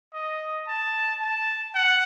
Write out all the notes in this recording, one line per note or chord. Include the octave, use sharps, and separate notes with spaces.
D#5
A5
A5
F#5